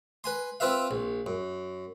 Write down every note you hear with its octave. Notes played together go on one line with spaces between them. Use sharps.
B4 G#5 C6
C4 F4 B4 E5 F5
A#1
F#2